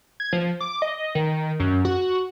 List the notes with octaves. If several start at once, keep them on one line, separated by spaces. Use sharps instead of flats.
G#6
F3
D6
D#5
D#3
F#2
F#4